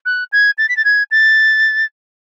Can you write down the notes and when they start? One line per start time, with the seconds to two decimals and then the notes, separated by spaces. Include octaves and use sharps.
0.06 F#6
0.32 G#6
0.58 A6
0.69 B6
0.77 A6
0.85 G#6
1.11 A6